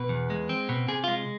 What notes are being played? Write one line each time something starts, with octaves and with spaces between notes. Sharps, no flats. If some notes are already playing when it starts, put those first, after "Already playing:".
Already playing: B2 B4
E2
G#3
C4
B2
C3 G#4
G#3 F4